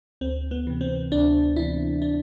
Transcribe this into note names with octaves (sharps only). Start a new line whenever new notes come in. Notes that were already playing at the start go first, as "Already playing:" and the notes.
D2 C4
B3
C3 E3
C4
D2 D4
C3 E3 E4
D4